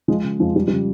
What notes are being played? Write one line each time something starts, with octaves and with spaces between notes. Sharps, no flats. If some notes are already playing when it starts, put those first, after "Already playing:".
F3 G#3
C#3
F2 F3 G#3
F3 G3
G3
C#3